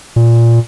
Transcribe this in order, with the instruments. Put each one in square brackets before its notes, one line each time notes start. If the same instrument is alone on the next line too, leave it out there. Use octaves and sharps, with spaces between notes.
[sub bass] A#2